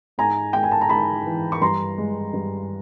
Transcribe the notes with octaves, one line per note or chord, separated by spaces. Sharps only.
G#2 G#5 A#5
G#3 G5
G#5
A5
A#5
G#2 A5 B5
E3
C#6
G2 A#5 C6
G#3
G2